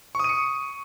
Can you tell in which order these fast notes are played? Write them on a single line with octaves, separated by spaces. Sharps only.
C#6 D#6 D#7 C#7